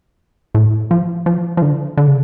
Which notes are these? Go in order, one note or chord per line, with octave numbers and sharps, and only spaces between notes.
A2
F3
F3
F3
D3
D3
C#3